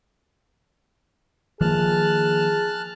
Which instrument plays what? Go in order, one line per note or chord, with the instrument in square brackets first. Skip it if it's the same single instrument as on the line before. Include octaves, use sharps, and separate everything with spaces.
[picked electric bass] D#3 F3 A#3 [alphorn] G#4 [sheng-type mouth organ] A5 F6 F#6